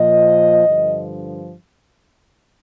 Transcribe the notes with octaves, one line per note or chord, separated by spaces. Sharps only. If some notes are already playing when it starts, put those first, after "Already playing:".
Already playing: A#2 F3 D#5
G2 D3 F3